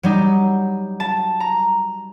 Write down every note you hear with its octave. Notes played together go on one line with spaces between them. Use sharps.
F#3 G3 D#4
A5
A#5